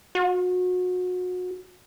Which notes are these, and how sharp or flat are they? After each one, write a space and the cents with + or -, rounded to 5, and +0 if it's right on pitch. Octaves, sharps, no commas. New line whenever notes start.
F#4 -30